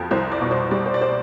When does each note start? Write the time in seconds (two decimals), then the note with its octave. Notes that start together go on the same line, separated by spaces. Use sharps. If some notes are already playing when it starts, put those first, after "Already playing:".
Already playing: F2 F3
0.11 C2 C5
0.32 D5
0.41 B2
0.51 C5
0.71 G3 D5
0.86 C5
0.94 D5
1.01 C5